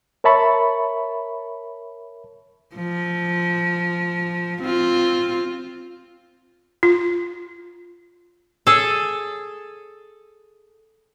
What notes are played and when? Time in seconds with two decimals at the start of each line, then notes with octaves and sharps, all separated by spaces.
0.24 A#4 C#5 E5 A5 B5 C#6
2.76 F3
4.62 C4 F4
6.83 F4
8.67 G#4 A4 C#5 E6